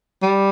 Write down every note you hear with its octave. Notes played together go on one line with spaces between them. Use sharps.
G3